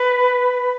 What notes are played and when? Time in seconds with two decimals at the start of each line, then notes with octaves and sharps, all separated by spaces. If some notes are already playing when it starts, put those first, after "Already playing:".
Already playing: B4